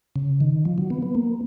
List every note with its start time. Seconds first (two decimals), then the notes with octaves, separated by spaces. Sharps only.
0.16 C#3
0.40 D#3
0.65 F3
0.78 F#3
0.90 B3
1.02 B3
1.15 A#3